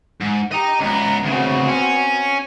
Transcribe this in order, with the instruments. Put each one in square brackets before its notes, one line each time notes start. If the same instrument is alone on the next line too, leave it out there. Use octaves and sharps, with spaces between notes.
[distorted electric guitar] G#2
[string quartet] G4 [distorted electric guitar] D#5 A#5
[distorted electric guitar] C#2 B3 [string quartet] A#5
[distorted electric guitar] D2 C#3 [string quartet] B3 C4 F#4
[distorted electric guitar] C#4